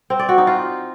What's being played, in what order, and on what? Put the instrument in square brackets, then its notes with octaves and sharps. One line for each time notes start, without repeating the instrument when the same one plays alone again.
[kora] C4
D5
F#4
D#4
F4